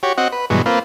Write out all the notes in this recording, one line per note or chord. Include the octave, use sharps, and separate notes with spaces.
F#4 G4 C#5
C4 F#4 D#5 F#5
B4
G2 B2 E3 F#3 G#3
A#3 C4 F4 B4